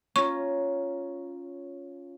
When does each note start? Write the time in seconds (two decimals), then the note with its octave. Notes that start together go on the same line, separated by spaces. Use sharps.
0.16 C#4 F4 A#5 C#6